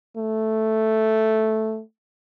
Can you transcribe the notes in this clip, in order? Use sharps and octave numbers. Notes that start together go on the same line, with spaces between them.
A3